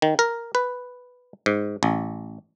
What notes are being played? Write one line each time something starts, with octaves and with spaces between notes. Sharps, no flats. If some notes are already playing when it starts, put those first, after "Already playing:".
D#3
A#4
B4
G#2
A1